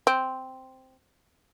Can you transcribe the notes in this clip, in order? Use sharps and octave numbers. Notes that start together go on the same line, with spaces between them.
C4